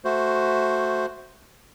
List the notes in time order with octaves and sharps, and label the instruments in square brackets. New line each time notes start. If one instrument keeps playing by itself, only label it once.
[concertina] A3 F#4 C5